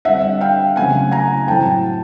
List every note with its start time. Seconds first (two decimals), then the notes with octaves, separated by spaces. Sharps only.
0.05 D3 G3 C4 E5 F#5
0.41 F5 G5
0.76 C#3 F#3 A3 C4 F#5 G#5
1.12 G#5 A#5
1.47 A2 F#3 A3 C4 G5 A5